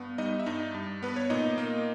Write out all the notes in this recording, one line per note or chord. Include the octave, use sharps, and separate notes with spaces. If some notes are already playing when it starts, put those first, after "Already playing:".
Already playing: G2 B3
G3 D#4 D#5
E5
G2 D#4 D#5
G2
B3 B4
C#5
A#2 D#4 D#5
A#3